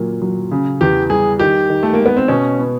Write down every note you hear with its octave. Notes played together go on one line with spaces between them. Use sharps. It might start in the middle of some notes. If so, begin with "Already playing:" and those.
Already playing: A#2 F#3 A#3
F#3
C#3
E2 G4
G3 G#4
D#3 G4
D#3
A3
A#3
G#3
B3
C4
B2 C#4
B3